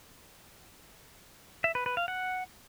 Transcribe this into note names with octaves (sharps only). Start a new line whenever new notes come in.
E5
B4
B4
F5
F#5